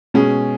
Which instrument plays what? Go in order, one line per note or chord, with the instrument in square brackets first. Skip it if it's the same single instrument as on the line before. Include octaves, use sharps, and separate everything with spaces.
[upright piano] B2 G#3 C#4 G#4